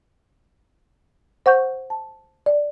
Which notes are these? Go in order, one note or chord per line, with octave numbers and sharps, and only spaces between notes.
C5 F#5 C#6 G6
A5
D5